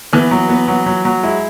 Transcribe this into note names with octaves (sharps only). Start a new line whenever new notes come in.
E3 B3
F#3
B3
F#3
F#3
F#3
G#3 E4